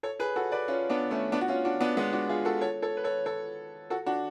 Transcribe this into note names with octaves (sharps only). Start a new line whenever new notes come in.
A4 C#5
G#4 B4
F#4 A4
B4 D5
C#4 F4
B3 D4
A3 C#4
B3 D4
F#4
C#4 F4
D4 F#4
B3 D4
G#3 B3
D4 F#4
F4 G#4
F#4 A4
A4 C#5
A4 C#5
B4
A4 C#5
A4 C#5
F#4 A4
D4 F#4